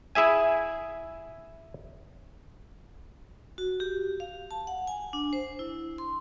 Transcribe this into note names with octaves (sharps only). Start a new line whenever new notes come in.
E4 G#4 E5 G#5
F#4
G4
F5
A5
F#5
G#5
D4
C5
E4
C6